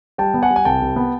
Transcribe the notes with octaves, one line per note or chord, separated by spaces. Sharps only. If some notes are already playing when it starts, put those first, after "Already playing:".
G3 G5 A5
B3
F#5 G#5
G3
G#5
C2 G5 A5
C2
B3